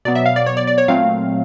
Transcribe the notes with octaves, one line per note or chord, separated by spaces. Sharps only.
B2 F#3 B3 D5
E5
F5
D5
C#5
D5
D5
C#5
A#2 F#3 A3 C4 F5